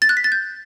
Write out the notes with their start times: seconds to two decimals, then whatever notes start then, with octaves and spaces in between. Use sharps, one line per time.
0.02 A6
0.09 F#6
0.17 B6
0.24 A6
0.32 G6